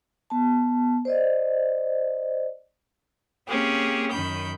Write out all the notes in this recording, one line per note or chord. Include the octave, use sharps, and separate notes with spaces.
B3 A5
C5 D5 D#5
A#3 C4 C#4 G4 G#4
F#2 D#3 B5 G6